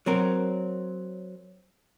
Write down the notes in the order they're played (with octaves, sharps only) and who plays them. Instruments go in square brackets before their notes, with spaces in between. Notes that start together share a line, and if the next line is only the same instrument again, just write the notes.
[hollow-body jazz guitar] F#3 C4 A#4